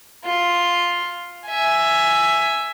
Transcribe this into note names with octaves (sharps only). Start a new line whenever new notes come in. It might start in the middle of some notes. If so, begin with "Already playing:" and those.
F4
E5 G#5